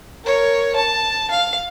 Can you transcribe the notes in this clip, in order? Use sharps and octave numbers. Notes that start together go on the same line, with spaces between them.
A#4 C#5
A5
F5